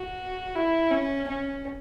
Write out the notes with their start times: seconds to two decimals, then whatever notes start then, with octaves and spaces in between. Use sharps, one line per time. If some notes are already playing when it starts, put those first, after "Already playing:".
Already playing: F#4
0.56 E4
0.92 C#4
1.29 C#4